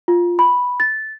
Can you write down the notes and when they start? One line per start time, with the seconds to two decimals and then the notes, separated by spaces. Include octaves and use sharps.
0.08 F4
0.39 B5
0.80 A6